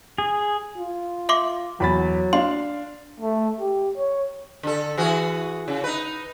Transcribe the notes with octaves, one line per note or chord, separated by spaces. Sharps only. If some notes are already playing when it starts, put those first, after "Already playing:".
G#4
F4
E5 C6 D6
E2 F#3 B5 A6
D4 F5 C6
A3
G4
C#5
D3 A4
E3 F#4 G#4
C#3
D#4 B4